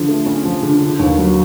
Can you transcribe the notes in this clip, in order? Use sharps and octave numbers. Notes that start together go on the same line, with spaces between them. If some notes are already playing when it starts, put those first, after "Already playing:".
Already playing: D3 F3
A3
C#4
F3
D3
D3
D#2
F#3